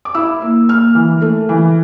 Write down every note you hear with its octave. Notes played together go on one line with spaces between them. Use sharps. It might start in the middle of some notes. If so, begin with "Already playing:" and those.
D6
E4 E6
A#3
A#3 F6
E3
A3
E3